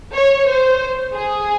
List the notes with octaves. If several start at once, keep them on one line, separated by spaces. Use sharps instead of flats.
C#5
C5
G#4